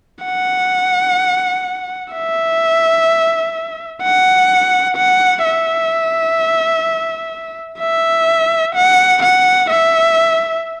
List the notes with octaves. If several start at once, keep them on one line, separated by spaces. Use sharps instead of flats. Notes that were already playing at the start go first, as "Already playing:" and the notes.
F#5
E5
F#5
F#5
E5
E5
F#5
F#5
E5